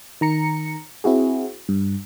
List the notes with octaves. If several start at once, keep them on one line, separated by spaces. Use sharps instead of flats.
D#3 A#5 C#7
C4 E4 F#4 G#4
G2